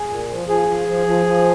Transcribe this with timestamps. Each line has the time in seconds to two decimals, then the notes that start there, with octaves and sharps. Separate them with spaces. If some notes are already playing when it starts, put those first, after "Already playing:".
Already playing: G#4
0.08 A#2
0.29 F3
0.48 F3 G#4
0.68 F3
0.88 F3
1.06 F3
1.26 F3